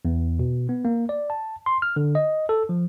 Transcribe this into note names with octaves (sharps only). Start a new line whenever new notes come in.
E2
B2
B3
A#3
D5
A5
C6
F6
D3
D#5
A4
F3